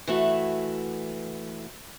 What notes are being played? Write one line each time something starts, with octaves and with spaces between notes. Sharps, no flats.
E3 A3 F#4